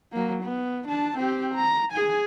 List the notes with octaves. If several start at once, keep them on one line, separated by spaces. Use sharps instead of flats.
F#3 A#3
B3
D4 A5
C4 G4
A#5
G#4 G#5